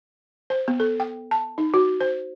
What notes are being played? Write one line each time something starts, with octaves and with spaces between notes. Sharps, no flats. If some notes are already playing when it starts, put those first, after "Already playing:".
C5
B3
A4
G5
A5
D#4
F#4
C5